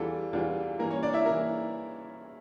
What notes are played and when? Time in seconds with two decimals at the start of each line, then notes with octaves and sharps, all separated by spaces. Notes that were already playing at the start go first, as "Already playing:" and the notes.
Already playing: E2 E3 G3 D4 F4 A4
0.33 E2 E3 G3 D4 F4
0.79 G2 E3 A#3 A#4
0.91 C#4 C#5
1.03 D4 D5
1.13 E4 E5
1.25 E3 A#3 A#4 A#5